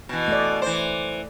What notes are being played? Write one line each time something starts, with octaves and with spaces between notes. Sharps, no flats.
B2 E3
A3 D5
E3 C5